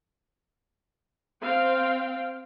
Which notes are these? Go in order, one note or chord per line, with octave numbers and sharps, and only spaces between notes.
C4 F5 G5